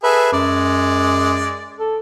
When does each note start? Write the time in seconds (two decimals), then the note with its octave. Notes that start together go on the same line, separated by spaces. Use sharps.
0.04 G#4 A4 B4 E5
0.33 F#2 G#3 D5
1.79 A4